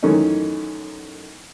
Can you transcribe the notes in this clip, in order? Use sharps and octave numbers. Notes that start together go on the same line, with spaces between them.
F#2 D#3 E3 A3 C#4 D#4